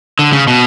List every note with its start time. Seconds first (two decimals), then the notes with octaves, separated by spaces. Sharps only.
0.19 D3
0.33 C#3
0.48 B2